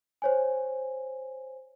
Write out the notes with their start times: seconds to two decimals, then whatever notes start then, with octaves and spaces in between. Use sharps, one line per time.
0.22 C5 C#5 G#5